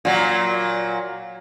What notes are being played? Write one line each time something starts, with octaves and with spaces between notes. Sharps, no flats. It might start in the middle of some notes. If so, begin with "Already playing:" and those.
A#2 F#3